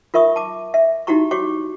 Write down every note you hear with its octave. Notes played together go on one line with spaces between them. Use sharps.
F4 A#4 E5 C#6 D#6
A5 D6
E5
D#4 E4 F#4 G4 A#5 C#6
F#4 G4 C#5 C#6 D6